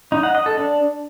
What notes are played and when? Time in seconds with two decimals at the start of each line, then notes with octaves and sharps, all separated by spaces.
0.12 D#4
0.23 F#5
0.35 D#5
0.46 A4
0.57 D4